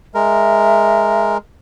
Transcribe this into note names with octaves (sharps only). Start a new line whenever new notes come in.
G#3 A#4 E5